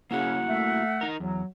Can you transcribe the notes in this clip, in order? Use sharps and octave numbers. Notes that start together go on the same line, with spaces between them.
C#3 A#3 C#4 E4 F#4 F#5
A3 E5
D#4 A#4
E2 F#3